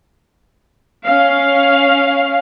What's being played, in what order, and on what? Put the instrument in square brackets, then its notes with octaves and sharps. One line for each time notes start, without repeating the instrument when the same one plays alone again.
[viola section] C#4 F5